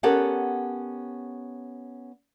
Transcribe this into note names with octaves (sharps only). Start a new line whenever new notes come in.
B3 C#4 G4 A4 A#4 F#5